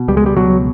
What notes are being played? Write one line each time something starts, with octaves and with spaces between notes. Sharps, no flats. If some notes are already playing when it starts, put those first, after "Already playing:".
Already playing: B2
C#2 G3
G#3
G3
B2 F#3